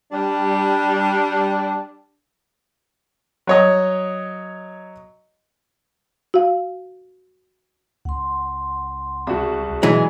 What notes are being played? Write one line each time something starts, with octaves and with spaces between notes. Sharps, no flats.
G3 D4
F#3 C#5 D#5
F#4 F5
C#2 F#5 C6
C2 F#4 G#4 D5
B2 E3 F#3 G#3